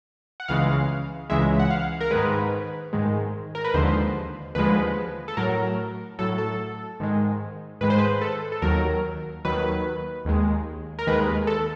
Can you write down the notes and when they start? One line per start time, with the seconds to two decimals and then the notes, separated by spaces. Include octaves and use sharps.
0.40 F#5
0.48 C#2 C#3 E3 G#3 F5
1.30 C#2 C#3 E3 G#3 E5
1.59 F#5
1.70 F5
2.01 A#4
2.11 G#2 D#3 G#3 B4
2.93 G#2 D#3 G#3
3.55 A#4
3.65 B4
3.74 D#2 D3 F3 G#3 C5
4.55 D#2 D3 F3 G#3 B4
5.28 A4
5.37 A2 F#3 A#4
6.19 A2 F#3 A4
6.38 A4
7.00 G#2 D#3 G#3
7.81 G#2 D#3 G#3 B4
7.90 C5
7.98 B4
8.21 A4
8.52 A4
8.62 D#2 D#3 F#3 A#4
9.45 D#2 D#3 F#3 B4
10.25 D#2 D#3 G#3
10.99 A#4
11.07 D#2 D#3 G#3 B4
11.47 A4